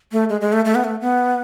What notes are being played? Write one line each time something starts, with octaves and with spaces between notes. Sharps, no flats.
A3
G#3
G#3
A3
A3
B3
A3
B3